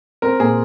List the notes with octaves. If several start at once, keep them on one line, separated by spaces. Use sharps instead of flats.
C4 A#4
A#2 G#4